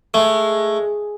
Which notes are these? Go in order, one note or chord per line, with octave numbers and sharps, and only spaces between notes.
G#3 A3